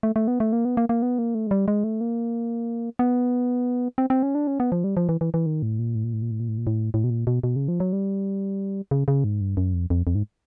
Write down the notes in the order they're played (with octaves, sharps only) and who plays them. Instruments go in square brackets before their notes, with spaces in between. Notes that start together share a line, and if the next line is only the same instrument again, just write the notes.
[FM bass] A3
A3
B3
A3
A#3
B3
A#3
A#3
B3
A#3
A3
G#3
G3
G#3
A3
A#3
B3
C4
C4
C#4
D4
C#4
B3
F3
G3
F3
E3
E3
E3
D#3
A2
A#2
A2
A#2
A2
A#2
A2
A#2
A2
A#2
A2
A2
B2
A#2
B2
B2
C#3
F3
F#3
G3
C#3
C#3
G#2
G2
F#2
F2
F2
F2
G#2